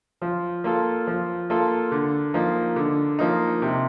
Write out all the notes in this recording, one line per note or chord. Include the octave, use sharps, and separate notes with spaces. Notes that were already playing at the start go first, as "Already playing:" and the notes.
F3
A#3 F4 A4
F3
A#3 F4 A4
D3
F3 A#3 D#4
D3
F3 A#3 D#4
C3